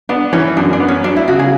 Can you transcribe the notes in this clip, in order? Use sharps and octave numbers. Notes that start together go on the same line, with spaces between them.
B3 D4
E3 C#4
F#2 D4
D4
B3
C#4
F#3 D4
E4
C#3 F#4
G#4